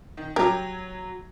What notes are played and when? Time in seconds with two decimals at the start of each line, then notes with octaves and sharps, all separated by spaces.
0.17 D#3
0.36 F#3 G4 A#4 G#6